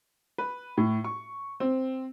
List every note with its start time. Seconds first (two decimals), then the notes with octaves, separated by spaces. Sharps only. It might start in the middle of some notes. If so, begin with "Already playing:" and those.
0.38 B4
0.77 A2
1.04 C#6
1.60 C4